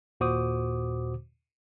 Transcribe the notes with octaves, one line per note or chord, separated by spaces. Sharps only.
D#2 A#2 F#4 C5 D6 D#6